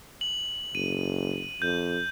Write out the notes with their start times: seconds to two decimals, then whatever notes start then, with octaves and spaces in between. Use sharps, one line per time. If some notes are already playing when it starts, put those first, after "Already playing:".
0.21 F#7
0.75 F#1 D#7
1.62 F2 G6